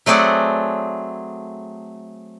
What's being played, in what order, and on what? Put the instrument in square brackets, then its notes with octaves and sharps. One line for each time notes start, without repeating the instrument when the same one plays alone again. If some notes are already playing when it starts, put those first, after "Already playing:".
[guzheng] F#3 A3 C4 G#4 D5 F#5